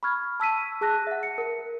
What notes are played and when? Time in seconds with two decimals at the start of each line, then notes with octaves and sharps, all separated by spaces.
0.03 B5 C#6 F6 G#6
0.40 A5 E6 B6 D#7
0.81 G#4 A5 F#6 A#6
1.07 E5 F#5
1.23 C#7
1.38 A#4